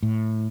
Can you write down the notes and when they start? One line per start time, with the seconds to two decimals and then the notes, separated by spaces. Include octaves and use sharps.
0.03 A2